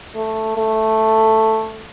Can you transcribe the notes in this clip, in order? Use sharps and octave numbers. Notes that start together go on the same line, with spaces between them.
A3
A3